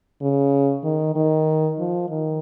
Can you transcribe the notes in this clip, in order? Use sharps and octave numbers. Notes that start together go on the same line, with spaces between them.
C#3
D#3
D#3
F3
D#3